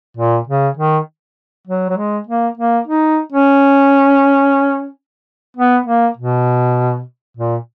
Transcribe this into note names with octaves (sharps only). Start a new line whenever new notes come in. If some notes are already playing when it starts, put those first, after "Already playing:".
A#2
C#3
D#3
F#3
F#3
G#3
A#3
A#3
D#4
C#4
B3
A#3
B2
A#2